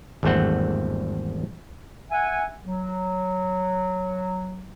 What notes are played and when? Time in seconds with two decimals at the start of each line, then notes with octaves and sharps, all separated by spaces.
0.23 G#1 E2 G2 A3 C4 F#5
2.11 E5 F#5 G#5
2.64 F#3